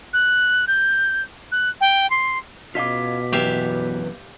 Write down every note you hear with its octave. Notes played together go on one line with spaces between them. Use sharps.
F#6
G6
F#6
G5
C6
B2 F4 D#5 F5 D6 B6
F#2 E3 B3 G4 E5 F5